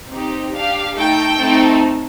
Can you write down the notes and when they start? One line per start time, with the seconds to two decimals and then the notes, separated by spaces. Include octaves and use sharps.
0.09 C4 D#4 G4
0.52 D4 G4 F5
0.95 A3 D#4 A4 G5
1.39 A3 C4 D#4 A4